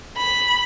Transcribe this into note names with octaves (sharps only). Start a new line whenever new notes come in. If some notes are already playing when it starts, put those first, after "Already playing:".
B5